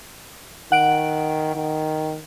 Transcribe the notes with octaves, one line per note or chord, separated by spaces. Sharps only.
D#3 F#5 D7
D#3